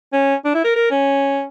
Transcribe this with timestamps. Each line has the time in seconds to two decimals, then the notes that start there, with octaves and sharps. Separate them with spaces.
0.13 C#4
0.44 D4
0.54 E4
0.64 A#4
0.76 A#4
0.90 C#4